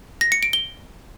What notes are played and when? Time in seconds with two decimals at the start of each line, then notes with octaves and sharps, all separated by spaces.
0.21 A#6
0.32 C#7
0.43 D7
0.53 G7